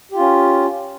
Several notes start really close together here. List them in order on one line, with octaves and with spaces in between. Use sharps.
G4 F4 C#4